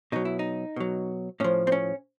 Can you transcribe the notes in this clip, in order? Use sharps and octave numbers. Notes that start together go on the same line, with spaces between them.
B2 F#3 D#4
E4
D#4
B2 F#3
A2 F3 C#4
C4
C#4